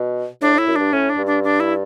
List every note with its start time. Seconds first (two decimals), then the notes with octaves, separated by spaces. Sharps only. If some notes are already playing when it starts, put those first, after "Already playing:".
Already playing: B2
0.41 A2 D4
0.54 A2
0.58 E4
0.67 F#2
0.76 G2 D4
0.92 A2 C#4
1.10 D4
1.18 G2
1.26 D4
1.43 D4
1.60 E4